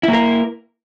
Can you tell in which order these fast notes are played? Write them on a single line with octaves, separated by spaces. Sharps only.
E4 A#3 A#4